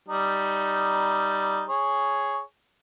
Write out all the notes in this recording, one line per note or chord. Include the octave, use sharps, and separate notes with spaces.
G3 D#4
G#4 C#5